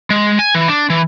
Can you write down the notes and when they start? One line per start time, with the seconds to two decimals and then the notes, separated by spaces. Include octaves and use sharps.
0.10 G#3
0.39 G#5
0.55 E3
0.68 D4
0.90 E3